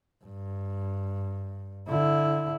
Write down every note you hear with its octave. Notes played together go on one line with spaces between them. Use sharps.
G2
D3 E4